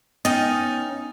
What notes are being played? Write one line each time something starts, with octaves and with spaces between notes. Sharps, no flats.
B3 C#4 D#4 D#5 G5 D#6 A6